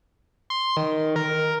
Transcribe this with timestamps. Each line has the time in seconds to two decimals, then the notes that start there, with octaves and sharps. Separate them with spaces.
0.50 C6
0.77 D#3
1.16 A#4